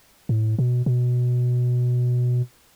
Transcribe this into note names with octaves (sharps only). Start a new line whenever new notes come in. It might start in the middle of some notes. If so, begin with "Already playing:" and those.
A2
B2
B2